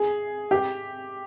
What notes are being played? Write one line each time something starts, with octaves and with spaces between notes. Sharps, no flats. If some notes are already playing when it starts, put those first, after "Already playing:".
Already playing: G#4
G4